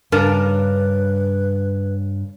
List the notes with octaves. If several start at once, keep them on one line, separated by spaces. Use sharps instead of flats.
G2 C#3 D4 A#4 B4